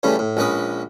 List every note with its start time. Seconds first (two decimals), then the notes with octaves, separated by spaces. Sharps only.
0.03 C#3 E3 G3 A3 C#4
0.19 A2
0.37 A#1 G#3 C#4 B4 D#6